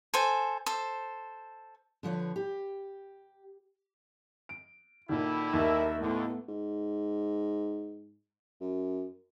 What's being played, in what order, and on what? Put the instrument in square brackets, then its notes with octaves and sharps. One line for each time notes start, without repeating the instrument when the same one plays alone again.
[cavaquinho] A4 C5 G#5
A4 C5
[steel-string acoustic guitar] D3 F3 B4 C#5
G4
[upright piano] D7
[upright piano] A#2 D#3 [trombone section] D3 G3 E4
[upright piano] D#2 [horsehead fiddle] A#4 E5
[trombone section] D#2 D3 [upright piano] A2 [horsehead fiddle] A3 B3
[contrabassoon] G#2
F#2